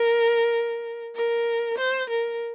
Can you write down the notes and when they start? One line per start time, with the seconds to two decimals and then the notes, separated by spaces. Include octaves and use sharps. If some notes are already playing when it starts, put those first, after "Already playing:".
Already playing: A#4
1.15 A#4
1.78 C5
2.09 A#4